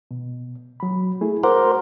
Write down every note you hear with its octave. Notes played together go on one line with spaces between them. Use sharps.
B2
F#3 B5
A3 E4 G#4
F#4 A#4 C5 F#5 D6